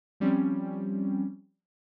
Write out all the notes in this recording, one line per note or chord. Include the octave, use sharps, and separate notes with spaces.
F3 G3 C4 C#4